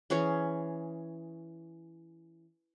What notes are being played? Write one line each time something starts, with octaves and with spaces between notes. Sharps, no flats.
E3 C#4 G#4 C#5